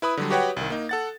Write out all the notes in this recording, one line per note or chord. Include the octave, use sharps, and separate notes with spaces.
E4 B4 B5 D#6
D3 F#3 G3
F#4 G4 B4 C#5 F#5 G5
C2 D#3
A#3 D#4
A4 F#5 A6